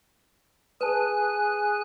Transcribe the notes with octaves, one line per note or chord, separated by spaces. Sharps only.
G#4 B4 G#5 A5 F#6